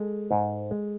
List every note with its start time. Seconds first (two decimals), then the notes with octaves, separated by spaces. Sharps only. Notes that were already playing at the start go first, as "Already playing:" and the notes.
Already playing: G#3 A4
0.31 G#2
0.71 G#3